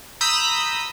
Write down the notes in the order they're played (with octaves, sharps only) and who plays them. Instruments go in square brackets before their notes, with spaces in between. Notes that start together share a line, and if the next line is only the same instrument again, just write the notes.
[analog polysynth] A#5 B5 D#6 E6 G6 B6